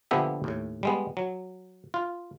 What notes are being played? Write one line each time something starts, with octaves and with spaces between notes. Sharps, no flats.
A#1 D3 F3 B3 G4 E5
D#2 A2
G3 G#3 B3
F#3
F4